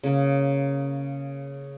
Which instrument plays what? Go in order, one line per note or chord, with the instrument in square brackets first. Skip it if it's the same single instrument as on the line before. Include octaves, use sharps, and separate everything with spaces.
[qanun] C#3 A#3